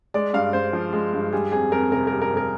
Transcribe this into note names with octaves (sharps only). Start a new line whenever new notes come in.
G#3 D5
G2 F5
G2 C5
F3
G#3
G2
G3 G#4
F2 G#4
F2 A#4
C3 A#4
G3 A#4
A#4
F2
A#4